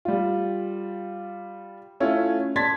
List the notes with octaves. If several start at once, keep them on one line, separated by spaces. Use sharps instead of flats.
G3 F4
A3 C#4 E4 F4
D5 A5 C6 G#6 A6 B6